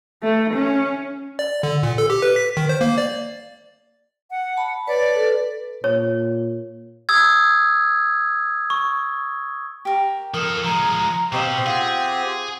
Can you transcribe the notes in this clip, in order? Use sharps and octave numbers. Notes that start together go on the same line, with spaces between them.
A3
C#4
D5
D3
A#2
A4
G4
B4
B6
D#3
C5
A#3
D5
F#5
A5 B5
B4 C#5 D5
A4 B4
A#2 C#5
D#6 E6 G#6
C#6
G4 A#4
F3 A4 A#4 D#6
F3 G#3 A#5
B2 C4 G4 C5 D#5 F5
F4 G#4 F#5